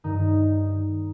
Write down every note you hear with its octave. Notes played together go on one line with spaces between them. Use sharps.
G2 D#3 D#4